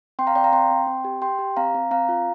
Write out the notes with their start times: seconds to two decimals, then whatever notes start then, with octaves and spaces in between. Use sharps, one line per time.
0.19 C4 G5 C6
0.27 F5 A#5
0.35 C4 D5 G5
0.44 F5 A#5
0.52 C4 G5 C6
0.71 C4
0.87 C4
1.04 G4
1.22 G4 G5 C6
1.39 G4
1.57 C4 F5 A#5
1.74 C4
1.91 C4 F5 A#5
2.09 F4